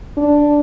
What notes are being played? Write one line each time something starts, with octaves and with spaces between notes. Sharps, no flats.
D4